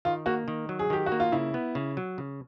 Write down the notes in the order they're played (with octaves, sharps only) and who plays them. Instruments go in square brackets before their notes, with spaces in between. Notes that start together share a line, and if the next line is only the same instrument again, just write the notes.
[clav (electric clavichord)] D#3 [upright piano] F4
[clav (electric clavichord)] A#3 [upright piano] F#4
[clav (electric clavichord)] D#3
F#3
[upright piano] G#4
[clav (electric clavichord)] D#3 [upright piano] G4
[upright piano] F#4
[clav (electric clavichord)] A#3
[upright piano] F4
[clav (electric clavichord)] C#3 [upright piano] E4
[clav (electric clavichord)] B3
C#3
F#3
C#3